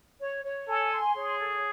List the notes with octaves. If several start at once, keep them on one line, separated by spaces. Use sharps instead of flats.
C#5
C#5
A4 G#5
C6
G#4 C#5
A4